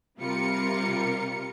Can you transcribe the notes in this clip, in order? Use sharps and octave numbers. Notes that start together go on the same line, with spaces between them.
C3 G3 F4 A#4 C#7